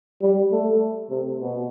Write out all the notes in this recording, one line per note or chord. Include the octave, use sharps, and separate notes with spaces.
G3
A3
C3
B2